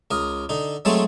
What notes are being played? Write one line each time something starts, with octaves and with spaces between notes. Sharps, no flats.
C#2 A#4 D#6
D3 D#4
F#3 G#3 A3 C4 A5 C6